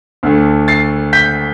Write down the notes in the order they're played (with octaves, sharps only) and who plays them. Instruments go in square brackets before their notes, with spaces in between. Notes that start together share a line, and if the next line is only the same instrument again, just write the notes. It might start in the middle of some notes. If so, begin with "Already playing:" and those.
[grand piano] D2 D3 A3
A6 C7
G6 B6